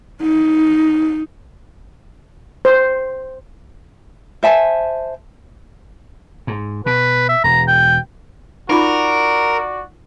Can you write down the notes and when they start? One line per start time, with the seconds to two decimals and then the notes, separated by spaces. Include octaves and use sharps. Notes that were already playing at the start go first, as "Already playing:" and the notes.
0.22 D#4
2.65 C5
4.43 C5 E5 G#5 A5
6.47 G#2
6.86 B2 B4
7.29 E5
7.44 E1 A#5
7.68 G5
8.70 D#4 F4 F#4 A#4 D5 B5